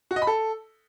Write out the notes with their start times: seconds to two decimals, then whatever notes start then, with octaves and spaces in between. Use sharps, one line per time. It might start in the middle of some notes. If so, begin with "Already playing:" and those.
0.11 F#4
0.16 D#5
0.22 B5
0.27 A4